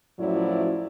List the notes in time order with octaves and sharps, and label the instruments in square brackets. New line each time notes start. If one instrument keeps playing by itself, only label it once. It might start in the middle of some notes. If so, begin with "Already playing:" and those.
[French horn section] F#2 A2 F3 F#3 E4 D5